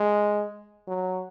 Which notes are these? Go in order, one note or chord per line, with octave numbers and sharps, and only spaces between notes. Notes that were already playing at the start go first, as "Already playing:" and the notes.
Already playing: G#3
F#3